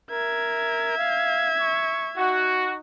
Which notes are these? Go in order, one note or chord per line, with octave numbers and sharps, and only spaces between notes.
A#4 E5 G#6
F5
C#6
D#4 F#4